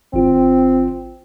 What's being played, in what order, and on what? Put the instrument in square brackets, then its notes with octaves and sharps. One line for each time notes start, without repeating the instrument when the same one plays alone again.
[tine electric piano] G#1 F4 [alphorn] C4